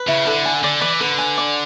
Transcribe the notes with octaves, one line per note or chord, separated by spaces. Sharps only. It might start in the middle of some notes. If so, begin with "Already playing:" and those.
Already playing: B4
C#3 E4
D3 A4
G#5
D3 D5
E3 D6
D3 B4
G#5
D5